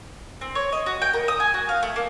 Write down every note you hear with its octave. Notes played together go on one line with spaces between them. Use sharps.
C4
C#5
D#5
F#4
G5
A#4
D#6
G#5
F#4
F5
A3
A#3